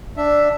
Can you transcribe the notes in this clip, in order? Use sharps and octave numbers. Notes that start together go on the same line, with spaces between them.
D4 E5